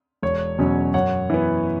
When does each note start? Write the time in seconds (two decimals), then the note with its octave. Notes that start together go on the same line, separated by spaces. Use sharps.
0.22 E1 C#5
0.58 E2 B2 F#3 C#4
0.94 F#2 C#5 F#5
1.30 E3 B3